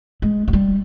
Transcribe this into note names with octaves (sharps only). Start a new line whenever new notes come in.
G#3
F#3
G3